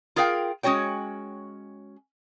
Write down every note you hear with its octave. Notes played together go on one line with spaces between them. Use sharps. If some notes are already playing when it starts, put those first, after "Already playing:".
F4 G#4 A#4 F5 G5
G#3 C#4 F#4 C#5 G5